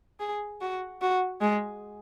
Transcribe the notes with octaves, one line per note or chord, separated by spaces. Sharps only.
G#4
F#4
F#4
G#3